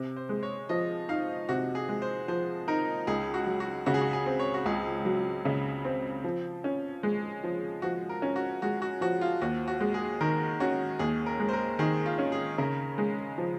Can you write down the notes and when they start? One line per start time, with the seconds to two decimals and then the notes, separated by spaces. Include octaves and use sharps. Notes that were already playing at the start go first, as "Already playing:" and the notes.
Already playing: C3
0.16 C5
0.29 G#3
0.43 C#5
0.69 F3 D#5
1.09 D#4 F5
1.49 C3 F#4
1.75 G#4
1.89 G#3
2.02 C5
2.28 F3 C5
2.68 D#4 A#4
3.07 C#2 G#4
3.34 F#4
3.47 F#3
3.60 F#4
3.86 C#3 F#4
3.94 G#4
4.01 F#4
4.13 G#4
4.26 C4
4.39 C#5
4.54 F#4
4.66 C#2 G#4
5.05 F#3
5.45 C#3
5.85 C4
6.24 F3
6.64 C#4
7.03 G#3
7.44 F3
7.82 F3 F#4
8.09 A#4
8.22 C#4
8.36 F#4
8.62 G#3 F#4
8.82 F#4
9.01 F3 F#4
9.21 F4
9.42 D#2 F#4
9.68 F#4
9.80 G#3
9.94 G#4
10.21 D#3 A#4
10.60 C#4 F#4
10.99 D#2 G#4
11.26 A#4
11.39 G#3
11.49 C5
11.53 A#4
11.79 D#3 G#4
12.06 F4
12.18 C#4
12.32 G#4
12.58 C#3 A#4
12.98 G#3
13.38 F3